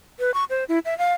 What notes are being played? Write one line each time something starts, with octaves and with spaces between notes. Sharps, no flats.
B4
C#6
C5
E4
E5
F5